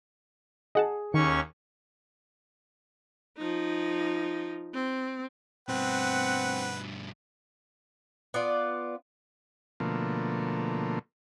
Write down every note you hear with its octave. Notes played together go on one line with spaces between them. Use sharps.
G#4 D#5 F#5 A5
D#2 D#3 C#4 C#6
F3 D#4
C4
G2 B2 C4 B4 F#5
B3 F4 D5
B2 D3 F3 A3 A#3